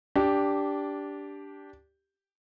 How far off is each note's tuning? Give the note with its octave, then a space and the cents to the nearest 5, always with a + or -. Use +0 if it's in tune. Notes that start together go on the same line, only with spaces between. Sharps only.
D4 -15 G4 +0